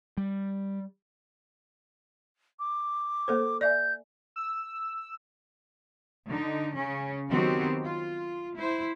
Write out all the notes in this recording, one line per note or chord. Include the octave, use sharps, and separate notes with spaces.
G3
D6
A#3 A4 C5
D5 E5 G#5 G6
E6
D3 D#4
C#3 C#4
D#3 F#3 B3 C4 F#4 G4
F4
E4 C5